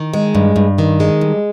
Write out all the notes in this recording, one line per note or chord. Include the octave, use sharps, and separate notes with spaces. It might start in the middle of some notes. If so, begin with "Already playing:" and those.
Already playing: D#3
G#3
G2
G2
D#3
G#3
G2